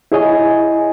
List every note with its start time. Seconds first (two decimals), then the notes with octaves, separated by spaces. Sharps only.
0.12 E4 G#4 C#5 D#5 G#5